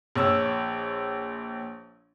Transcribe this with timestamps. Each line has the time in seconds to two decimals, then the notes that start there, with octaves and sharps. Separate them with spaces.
0.16 A#1 C#5 E6